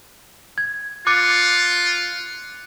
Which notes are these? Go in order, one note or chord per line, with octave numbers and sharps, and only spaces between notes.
G#6
F4 D6 F#6 C#7